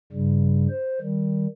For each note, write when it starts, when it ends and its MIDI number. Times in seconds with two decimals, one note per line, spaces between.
0.12 0.67 43
0.12 0.67 49
0.12 0.67 55
0.70 0.99 72
1.01 1.47 51
1.01 1.47 55